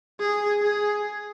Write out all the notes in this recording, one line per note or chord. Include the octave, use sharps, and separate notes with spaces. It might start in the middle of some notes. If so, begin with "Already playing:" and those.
G#4
G#4